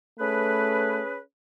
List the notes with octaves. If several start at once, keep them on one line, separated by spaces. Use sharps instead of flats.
A3 C#4 G#4 B4